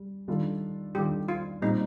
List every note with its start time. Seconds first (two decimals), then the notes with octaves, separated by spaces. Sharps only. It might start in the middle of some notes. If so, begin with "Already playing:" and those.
Already playing: G3
0.28 D#3 G3 D4 F4 A4
0.95 D#3 G3 D4 F4 G4 A4
1.28 F4
1.62 A#2 G3 C4 D#4